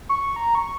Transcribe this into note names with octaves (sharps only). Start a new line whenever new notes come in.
C#6
A#5
C#6